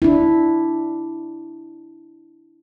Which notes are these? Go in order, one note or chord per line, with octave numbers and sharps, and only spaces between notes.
D4 E4